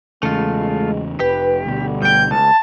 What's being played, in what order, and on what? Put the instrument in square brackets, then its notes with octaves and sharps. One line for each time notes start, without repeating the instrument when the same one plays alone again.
[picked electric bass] E2 C#3 [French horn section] G#3 [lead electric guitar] A3 F4
[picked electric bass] F1 [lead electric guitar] G4 [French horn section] B4
[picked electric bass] D2 B2 [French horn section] D3 G3
[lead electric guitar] G2 G5 [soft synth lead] G6
[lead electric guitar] C#2 [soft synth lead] A5